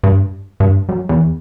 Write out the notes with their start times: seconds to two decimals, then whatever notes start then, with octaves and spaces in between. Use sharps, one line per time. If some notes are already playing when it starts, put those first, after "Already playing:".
0.04 G2
0.60 G2
0.89 F#2
1.09 E2